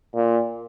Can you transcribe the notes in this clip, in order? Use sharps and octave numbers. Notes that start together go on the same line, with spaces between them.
A#2